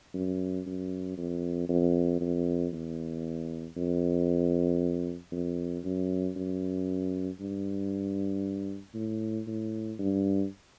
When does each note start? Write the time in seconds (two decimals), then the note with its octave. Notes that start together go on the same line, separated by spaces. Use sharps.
0.14 F#2
0.66 F#2
1.17 F2
1.69 F2
2.21 F2
2.73 E2
3.76 F2
5.32 F2
5.84 F#2
6.36 F#2
7.40 G2
8.94 A2
9.47 A2
9.98 G2